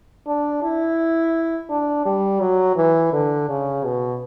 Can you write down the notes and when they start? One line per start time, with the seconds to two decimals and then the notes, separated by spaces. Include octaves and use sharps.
0.26 D4
0.62 E4
1.70 D4
2.06 G3
2.40 F#3
2.76 E3
3.12 D3
3.49 C#3
3.84 B2